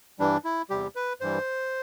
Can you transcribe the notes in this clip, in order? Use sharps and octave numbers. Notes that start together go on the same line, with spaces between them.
G2 E3 G3 D4
E4
E2 C3 G3 G4
B4
G2 E3 G3 C5